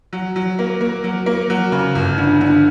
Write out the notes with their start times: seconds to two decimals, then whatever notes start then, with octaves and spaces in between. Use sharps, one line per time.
0.13 F#3
0.36 F#3
0.59 A#3
0.81 A#3
1.04 F#3
1.26 A#3
1.50 F#3
1.72 C#3
1.95 G1
2.18 D3
2.41 D3